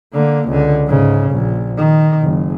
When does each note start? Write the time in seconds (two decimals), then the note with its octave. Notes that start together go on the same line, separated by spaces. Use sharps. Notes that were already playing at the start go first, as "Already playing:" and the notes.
0.14 D3 A#3
0.49 C#2 D3
0.87 G#2 C#3
1.31 A#1
1.78 D#3
2.22 F#1